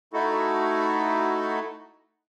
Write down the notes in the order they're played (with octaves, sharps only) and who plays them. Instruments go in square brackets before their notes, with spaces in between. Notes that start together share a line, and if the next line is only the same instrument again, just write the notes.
[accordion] A3 D#4 E4 F#4 A4